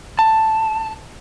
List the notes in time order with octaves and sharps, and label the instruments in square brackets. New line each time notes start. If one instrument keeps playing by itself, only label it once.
[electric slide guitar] A5